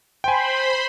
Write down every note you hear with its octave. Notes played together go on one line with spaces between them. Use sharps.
C5 G5 G#5 B5 C6